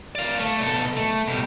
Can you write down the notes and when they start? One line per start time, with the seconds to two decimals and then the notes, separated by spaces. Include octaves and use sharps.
0.15 D5 F5
0.40 A3
0.61 B2 A4
0.97 A3
1.28 B2 G3